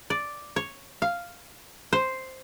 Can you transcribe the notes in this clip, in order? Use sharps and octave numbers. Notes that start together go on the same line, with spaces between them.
D5
C#5
F5
C5